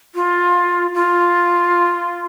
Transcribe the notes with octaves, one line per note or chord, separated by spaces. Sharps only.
F4
F4